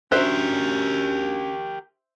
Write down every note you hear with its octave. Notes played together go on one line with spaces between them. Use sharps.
C#4 D4 F#4 G4 A#4 C5 E5 F#6